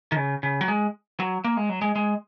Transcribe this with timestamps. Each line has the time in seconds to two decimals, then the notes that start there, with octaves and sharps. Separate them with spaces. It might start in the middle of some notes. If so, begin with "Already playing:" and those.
0.12 D#3
0.16 C#3
0.43 C#3
0.61 F#3
0.68 G#3
1.20 F#3
1.44 A#3
1.57 G#3
1.69 F#3
1.82 G#3
1.96 G#3